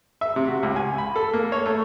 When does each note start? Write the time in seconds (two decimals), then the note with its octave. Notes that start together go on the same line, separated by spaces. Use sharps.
0.21 E5
0.36 C3
0.48 F#4
0.63 C#2
0.76 G#5
0.98 B5
1.16 A4
1.33 A#3
1.52 C#5
1.66 A3